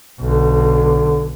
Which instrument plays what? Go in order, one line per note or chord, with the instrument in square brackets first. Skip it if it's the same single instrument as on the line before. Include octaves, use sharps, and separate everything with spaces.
[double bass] B1 [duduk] D3